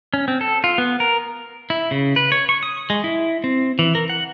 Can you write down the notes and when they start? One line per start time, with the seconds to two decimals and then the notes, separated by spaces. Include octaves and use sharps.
0.14 C#4
0.28 C4
0.41 A4
0.64 F4
0.78 B3
1.00 A#4
1.70 E4
1.91 C#3
2.16 B4
2.32 C#5
2.49 C#6
2.63 D#6
2.90 G#3
3.04 E4
3.44 C4
3.79 E3
3.95 A#4
4.09 F#5